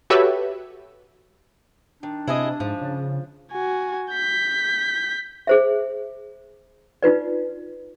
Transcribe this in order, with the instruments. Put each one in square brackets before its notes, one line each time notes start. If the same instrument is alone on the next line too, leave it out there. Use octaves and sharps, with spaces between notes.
[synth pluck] F#4 G4 A4 B4 C#5 E5
[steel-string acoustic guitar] D#3 [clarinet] D4
[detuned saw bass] C3 [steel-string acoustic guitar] E4 G#4 D#5
[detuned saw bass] G#2 [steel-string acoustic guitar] F3
[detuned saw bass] C#3
[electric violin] F#4 G#5
G6 B6
[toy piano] G#4 C5 E5
D#4 F4 B4 D5